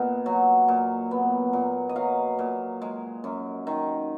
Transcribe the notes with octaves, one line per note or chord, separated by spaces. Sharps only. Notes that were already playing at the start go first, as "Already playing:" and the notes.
Already playing: A#2 B3 D#5 F#5
F#3
A#2
B3
A#2
D#5
F#3 F5
A#2
G#3
F#2
D#3